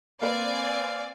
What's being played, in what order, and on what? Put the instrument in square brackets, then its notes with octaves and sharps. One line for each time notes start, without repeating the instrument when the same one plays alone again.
[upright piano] A#3 B4 [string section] C4 D5 G#5 [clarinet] F5